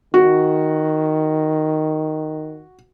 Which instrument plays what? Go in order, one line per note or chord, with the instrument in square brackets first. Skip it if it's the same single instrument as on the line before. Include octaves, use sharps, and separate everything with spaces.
[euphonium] D#3 [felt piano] F#4